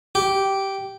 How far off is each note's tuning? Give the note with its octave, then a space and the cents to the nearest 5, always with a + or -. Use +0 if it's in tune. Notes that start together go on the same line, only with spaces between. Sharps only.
G4 -10